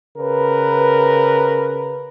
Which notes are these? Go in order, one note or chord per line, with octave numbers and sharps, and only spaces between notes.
C#3 A#4 B4